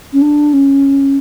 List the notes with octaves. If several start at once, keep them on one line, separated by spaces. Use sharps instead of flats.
C#4
D4
C#4